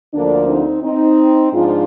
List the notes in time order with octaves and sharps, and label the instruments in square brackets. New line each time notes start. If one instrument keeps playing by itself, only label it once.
[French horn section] D2 D3 F3 A#3 D4
C4 D#4
C4 D#4
G#2 F3 D4 F4